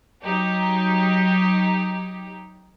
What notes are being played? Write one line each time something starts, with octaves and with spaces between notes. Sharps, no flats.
F#3 D#4 G4